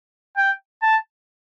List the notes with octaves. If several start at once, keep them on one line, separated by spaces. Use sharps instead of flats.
G5
A5